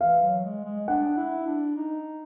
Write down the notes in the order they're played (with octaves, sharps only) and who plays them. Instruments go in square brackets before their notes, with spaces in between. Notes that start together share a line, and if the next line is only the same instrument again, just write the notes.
[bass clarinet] E3 [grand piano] F5
[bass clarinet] F#3
G#3
G#3
[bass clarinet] D4 [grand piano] F#5
[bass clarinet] E4
D4
D#4